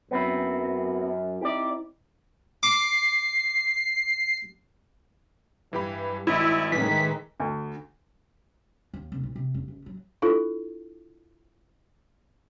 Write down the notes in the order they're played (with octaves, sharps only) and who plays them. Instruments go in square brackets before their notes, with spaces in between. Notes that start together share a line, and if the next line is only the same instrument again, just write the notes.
[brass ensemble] F#2 [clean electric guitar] B3 C4 E4
[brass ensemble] C4 D#4 E4 [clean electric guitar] G4 D5
[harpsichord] D6 [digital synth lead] C7
[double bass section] G2 [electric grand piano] E3 G4 B5
[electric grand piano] G#1 D#5 [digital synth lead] E4
[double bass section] A2 D#3 G#3 [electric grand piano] E3 [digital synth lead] B6
[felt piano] D2
[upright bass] D#2
F1
B1
C3
F1
F#1
F#3
[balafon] D4 E4 F4 A4